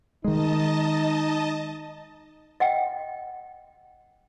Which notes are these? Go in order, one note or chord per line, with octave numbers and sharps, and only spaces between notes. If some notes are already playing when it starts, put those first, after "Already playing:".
D#3 G#3 D#4 D#5 A5
D#5 F#5 G5